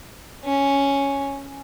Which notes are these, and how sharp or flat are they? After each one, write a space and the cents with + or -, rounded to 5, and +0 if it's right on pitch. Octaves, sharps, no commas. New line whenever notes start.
C#4 +0